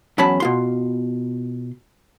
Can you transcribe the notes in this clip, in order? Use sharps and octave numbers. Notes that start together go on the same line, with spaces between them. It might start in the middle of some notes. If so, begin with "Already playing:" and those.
E2 F#3 C#4 A5 B5
B2 F4 C6